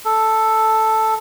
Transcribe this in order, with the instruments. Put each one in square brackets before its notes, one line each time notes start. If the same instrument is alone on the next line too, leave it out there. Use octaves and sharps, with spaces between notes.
[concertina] A4